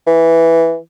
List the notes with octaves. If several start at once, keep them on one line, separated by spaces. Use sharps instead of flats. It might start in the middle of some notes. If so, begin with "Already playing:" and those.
E3